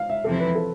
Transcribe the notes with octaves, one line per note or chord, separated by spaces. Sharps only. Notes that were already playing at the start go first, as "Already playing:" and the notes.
Already playing: F5
E5
E2 C3 F3 C4 E4 A4
B4
A4